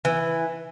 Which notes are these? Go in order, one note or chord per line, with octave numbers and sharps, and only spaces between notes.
E3